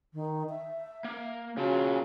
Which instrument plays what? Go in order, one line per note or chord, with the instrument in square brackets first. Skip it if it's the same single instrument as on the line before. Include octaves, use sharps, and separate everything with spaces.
[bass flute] D#3
E5
[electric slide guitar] A#3
[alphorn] C#3 [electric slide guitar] A#3 F4 A5 [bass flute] F#4